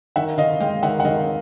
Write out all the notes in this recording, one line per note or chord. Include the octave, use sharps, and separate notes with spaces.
D#3 E5 F#5
D#3 D#5 F5
G#3 F5 G5
D#3 E5 F#5
F#5
D#3 D#5 F5